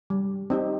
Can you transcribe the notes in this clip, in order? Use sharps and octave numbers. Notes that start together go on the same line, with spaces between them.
G3
C4 D#4 G4